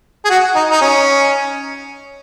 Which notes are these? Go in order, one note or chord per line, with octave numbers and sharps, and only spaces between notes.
G#4
F#4
D#4
D#4
C#4